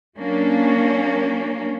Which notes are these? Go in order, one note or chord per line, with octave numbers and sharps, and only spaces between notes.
F#3 A#3 C#4 D4